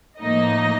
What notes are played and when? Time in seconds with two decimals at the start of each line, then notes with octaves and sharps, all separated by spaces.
0.21 A2 F3 A#3 D#4 D#5